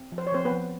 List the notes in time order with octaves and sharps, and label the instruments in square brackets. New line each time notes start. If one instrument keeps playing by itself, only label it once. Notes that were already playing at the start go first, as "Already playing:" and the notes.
Already playing: [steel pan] C4
F3
C5
C#5
F3 C4 C5
B3 B4
F3